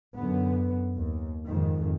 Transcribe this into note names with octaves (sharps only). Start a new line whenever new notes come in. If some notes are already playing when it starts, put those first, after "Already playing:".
F#2 D3 B3
D#2
F2 G#2 D#3